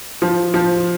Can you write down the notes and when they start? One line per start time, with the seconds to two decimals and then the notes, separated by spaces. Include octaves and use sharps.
0.22 F3
0.54 F3